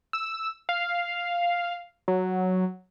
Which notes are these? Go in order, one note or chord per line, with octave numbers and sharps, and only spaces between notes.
E6
F5
F#3